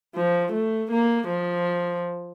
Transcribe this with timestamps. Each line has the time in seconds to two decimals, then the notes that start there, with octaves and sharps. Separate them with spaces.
0.15 F3
0.53 A3
0.91 A#3
1.29 F3